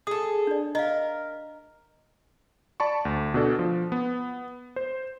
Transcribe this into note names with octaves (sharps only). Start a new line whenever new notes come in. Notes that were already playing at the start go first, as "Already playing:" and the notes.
G#4 A4 D#6
D4 D5
A#4 D#5 F5
D5 A5 B5 C#6
D2
B2 D4 A4
F3
B3
C5